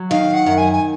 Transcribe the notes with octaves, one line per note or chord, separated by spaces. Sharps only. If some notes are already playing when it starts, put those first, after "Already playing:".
Already playing: F#3
D#3 F5
F#5
F#2
G#5
G#5